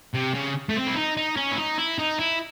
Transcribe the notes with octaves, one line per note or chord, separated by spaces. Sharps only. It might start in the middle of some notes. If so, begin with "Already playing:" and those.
C3
C#3
A3
C4
E4
D#4
D#4
C#4
E4
D#4
E4
D#4
E4